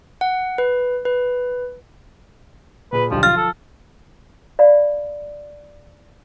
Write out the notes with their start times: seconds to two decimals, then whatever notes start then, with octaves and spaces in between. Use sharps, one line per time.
0.21 F#5
0.58 B4
1.05 B4
2.92 A#2 G#4 B4
3.11 B1 D3 F3 G3
3.23 F3 F4 F6 A6
3.37 A4
4.59 D5 F5 B5